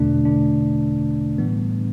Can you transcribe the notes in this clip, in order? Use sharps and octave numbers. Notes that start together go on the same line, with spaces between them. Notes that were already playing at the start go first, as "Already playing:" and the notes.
Already playing: E2 B2 D3 A3 D4
D3 D4
A2 E3 G3 B3